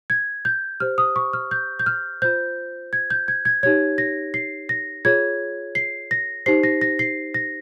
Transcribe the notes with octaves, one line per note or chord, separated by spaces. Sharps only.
G#6
G6
G4 C5 F6
D#6
C#6
F6
G6
G6
F6
F4 C5 G6
G#6
G6
G#6
G#6
D#4 G4 C#5 G#6
A#6
C7
A#6
F4 G#4 C#5 G#6
C7
A#6
D#4 G4 C5 C7
A#6
A#6
C7
A#6